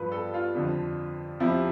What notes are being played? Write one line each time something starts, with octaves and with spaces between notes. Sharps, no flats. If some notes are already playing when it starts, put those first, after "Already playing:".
Already playing: G2 F3 B4
A4
F4
F2 D3 F3
F2 C3 F3 E4